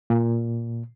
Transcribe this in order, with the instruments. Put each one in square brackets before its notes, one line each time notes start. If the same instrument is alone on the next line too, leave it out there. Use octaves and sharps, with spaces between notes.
[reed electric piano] A#2